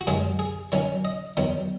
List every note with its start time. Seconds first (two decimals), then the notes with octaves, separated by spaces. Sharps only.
0.01 F#4
0.07 F#2 D#3 G#3 G#4
0.39 G#4
0.72 D#3 F#3 C#4 C#5
1.05 D#5
1.37 E2 D#3 F#3